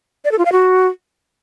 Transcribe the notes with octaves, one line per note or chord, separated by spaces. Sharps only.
D5
A4
F4
F5
F#4